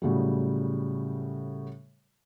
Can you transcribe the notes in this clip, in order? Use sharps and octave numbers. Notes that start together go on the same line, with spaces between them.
A2 C#3 F#3 G3